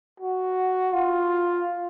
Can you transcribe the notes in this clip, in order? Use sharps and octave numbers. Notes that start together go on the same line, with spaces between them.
F#4
F4